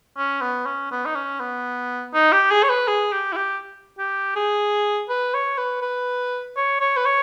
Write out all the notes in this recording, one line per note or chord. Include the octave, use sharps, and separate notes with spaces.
C#4
B3
C#4
B3
D#4
C#4
B3
D#4
G4
G#4
C#5
B4
G#4
G4
E4
G4
G4
G#4
B4
C#5
B4
B4
C#5
C#5
B4
C#5